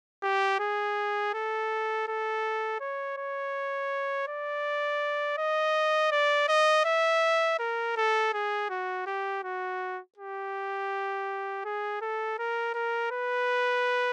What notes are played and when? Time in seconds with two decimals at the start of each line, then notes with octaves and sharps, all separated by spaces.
0.23 G4
0.60 G#4
1.34 A4
2.08 A4
2.81 C#5
3.18 C#5
4.28 D5
5.38 D#5
6.12 D5
6.48 D#5
6.85 E5
7.60 A#4
7.97 A4
8.33 G#4
8.70 F#4
9.07 G4
9.44 F#4
10.18 G4
11.65 G#4
12.02 A4
12.39 A#4
12.74 A#4
13.11 B4